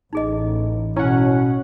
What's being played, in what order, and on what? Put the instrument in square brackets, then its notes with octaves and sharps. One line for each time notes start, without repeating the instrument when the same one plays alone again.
[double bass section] A1 [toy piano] D#4 G#4 D#5
[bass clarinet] B2 [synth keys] C#4 F#5 [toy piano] E4